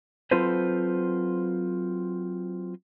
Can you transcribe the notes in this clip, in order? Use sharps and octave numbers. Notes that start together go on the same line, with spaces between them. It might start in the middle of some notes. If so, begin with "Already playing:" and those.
F#3 C4 F4 A4 B4 C5